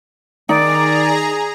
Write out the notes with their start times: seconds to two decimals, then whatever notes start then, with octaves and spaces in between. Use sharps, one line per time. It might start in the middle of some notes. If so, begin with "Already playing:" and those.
0.49 D#3 D#4 G#4 D5 A#5